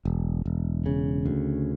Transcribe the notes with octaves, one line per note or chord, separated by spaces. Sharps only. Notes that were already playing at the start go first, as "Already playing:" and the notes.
E1
E1
C#3
D2